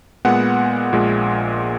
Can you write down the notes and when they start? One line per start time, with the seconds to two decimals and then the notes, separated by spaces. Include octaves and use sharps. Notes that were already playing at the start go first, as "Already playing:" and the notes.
0.25 A#2 G#3 B3 F#5
0.93 A#1 A#2 G#3